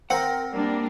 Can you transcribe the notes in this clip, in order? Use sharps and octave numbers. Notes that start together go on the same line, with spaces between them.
C4 A#4 F#5
G3 A#3 D4 A#4